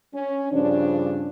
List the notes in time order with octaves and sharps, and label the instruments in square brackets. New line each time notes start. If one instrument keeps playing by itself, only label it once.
[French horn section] C#4
G2 C#3 F3 D4